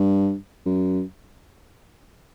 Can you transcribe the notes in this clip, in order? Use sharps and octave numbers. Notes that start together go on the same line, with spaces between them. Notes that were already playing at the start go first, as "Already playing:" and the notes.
Already playing: G2
F#2